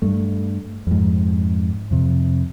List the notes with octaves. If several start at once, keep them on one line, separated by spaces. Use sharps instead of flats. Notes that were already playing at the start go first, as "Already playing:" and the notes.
G2 A3
F2 G#2
F2 C3